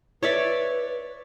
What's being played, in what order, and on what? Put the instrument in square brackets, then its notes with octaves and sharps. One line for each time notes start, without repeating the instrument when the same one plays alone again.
[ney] B4 [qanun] C#5 D5 E5